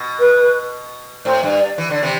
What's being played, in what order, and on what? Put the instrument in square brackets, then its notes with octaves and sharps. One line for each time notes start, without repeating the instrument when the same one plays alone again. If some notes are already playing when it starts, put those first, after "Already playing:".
Already playing: [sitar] B2
[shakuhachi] B4
[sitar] A2 [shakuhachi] C5
[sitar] G2
[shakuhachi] D5
[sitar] E3
D3
[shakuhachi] D5
[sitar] C3 E3